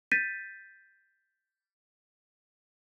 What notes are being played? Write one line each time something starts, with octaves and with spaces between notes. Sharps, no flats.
G6 A6 B6 D#7